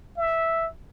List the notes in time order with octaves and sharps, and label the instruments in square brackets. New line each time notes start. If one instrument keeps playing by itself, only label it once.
[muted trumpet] E5